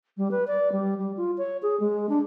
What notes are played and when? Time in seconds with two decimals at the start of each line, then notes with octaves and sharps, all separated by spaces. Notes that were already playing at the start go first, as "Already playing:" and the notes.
0.17 G3
0.31 B4
0.47 D5
0.72 G3
0.98 G3
1.17 F4
1.38 C#5
1.62 G#4
1.80 G#3
2.09 D4